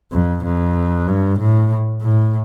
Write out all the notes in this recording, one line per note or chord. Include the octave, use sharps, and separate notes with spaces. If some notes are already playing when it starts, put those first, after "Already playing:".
F2
F2
G2
A2
A2